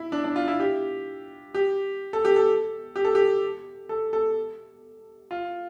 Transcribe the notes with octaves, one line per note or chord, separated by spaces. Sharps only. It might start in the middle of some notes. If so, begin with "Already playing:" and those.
Already playing: E4
D4
D4
F4
E4
G4
G4
A4
G4
A4
G4
A4
G4
A4
A4
F4